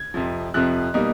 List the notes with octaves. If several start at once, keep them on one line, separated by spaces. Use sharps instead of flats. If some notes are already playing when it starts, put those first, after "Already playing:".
Already playing: G#6
F2 C3 F3
F2 C3 F3 F#6
B2 G3 A#3 D#4